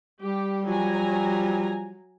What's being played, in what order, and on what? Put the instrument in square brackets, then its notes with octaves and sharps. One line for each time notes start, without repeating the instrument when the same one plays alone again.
[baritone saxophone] G3 [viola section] G4
[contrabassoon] F3 [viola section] F#3 G#5 A#5